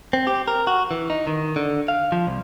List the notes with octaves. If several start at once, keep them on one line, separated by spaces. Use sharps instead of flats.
C4
G4
A#4
F#4
E3
D#4
D#3
D3
F5
F3
C2